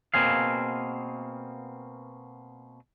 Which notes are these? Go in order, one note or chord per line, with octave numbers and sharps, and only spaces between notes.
B2 A#3 C4 G#4 F5